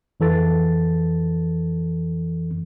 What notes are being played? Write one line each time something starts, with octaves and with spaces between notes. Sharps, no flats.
F2 E3 A4 A6